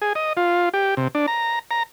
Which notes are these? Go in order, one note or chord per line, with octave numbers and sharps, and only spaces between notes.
G#4
D#5
F4
G4
C3
D4
A#5
A#5